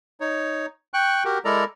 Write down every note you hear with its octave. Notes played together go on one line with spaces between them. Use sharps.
D#4 C#5
G5 C#6 F#6
F#4 G4 A#4
G#3 E4 A4 A#4 D5 A#5